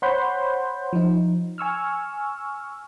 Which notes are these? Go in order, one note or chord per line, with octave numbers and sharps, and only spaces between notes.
C5 C#5 F#5 B5 C6 G6
F3 D#4
G#5 C#6 E6 F6